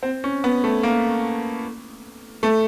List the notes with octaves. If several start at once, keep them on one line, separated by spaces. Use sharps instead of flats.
C4
C#4
B3
A3
A#3
A3